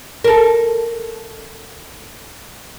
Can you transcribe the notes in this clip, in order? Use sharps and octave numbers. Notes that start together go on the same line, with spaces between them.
A4 A#4